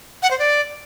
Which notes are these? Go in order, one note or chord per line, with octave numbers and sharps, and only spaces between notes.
F#5
C5
D5